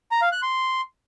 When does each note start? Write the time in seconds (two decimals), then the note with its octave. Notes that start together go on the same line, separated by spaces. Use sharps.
0.11 A#5
0.22 F5
0.32 F#6
0.42 C6